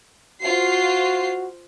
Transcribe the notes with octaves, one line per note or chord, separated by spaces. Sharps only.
F4 F#4 C5 C7